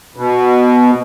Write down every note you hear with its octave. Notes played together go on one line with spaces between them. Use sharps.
B2